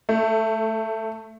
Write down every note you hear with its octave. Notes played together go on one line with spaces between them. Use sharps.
A3